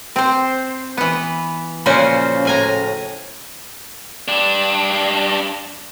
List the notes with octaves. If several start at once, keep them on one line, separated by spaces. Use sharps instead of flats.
C4 C5
E3 B3
A#2 C#3 F3 C#4 F#4 C5
A2 G#5 A#5
G3 D4